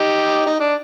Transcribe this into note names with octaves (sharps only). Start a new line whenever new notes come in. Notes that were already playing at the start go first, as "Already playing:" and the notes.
Already playing: D#4 G4
D#4
D4